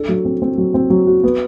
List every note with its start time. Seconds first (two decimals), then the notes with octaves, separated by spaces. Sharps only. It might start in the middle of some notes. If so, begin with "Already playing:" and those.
Already playing: D4 A4
0.09 F#3
0.25 C4
0.42 C4
0.58 F#3
0.74 C4
0.90 F#3
1.07 F#4
1.24 B3